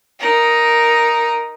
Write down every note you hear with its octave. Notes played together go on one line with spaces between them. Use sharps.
D#4 A#4